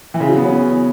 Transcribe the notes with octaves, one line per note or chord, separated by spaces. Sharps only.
E3
C#3
F#3
B3
C#4